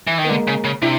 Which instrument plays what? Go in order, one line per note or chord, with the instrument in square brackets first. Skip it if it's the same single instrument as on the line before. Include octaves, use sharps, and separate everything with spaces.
[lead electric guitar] E3
D#3
[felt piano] B3
[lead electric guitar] D3 [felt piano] G#3 A#3
[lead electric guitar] C#3
C#3
[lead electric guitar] C3 [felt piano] D4 E4